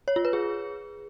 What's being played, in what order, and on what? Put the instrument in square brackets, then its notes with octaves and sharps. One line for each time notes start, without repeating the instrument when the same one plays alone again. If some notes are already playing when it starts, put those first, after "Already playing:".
[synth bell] C#5
F4
B4
G#4